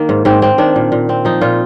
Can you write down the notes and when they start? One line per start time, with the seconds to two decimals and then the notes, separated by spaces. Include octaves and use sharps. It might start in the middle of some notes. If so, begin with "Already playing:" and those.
Already playing: D#3 A#3
0.09 G#2
0.25 G#2 C4
0.42 A#3 C4
0.58 D#3 D4
0.76 A#2
0.92 A#2
1.09 C4
1.25 F3 D#4
1.41 A#2 F4